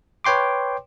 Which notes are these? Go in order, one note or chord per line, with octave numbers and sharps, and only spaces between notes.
B4 C#5 G5 C6 D6